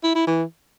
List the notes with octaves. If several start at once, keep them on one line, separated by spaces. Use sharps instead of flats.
E4
E4
E3